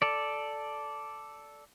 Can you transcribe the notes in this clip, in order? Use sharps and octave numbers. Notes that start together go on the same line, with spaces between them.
A4 D5